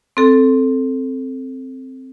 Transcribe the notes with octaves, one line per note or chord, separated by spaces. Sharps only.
C4 A4